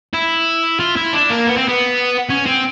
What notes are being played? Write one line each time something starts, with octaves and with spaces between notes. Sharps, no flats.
E4
F4
E4
D4
A#3
B3
C4
B3
C#4
C4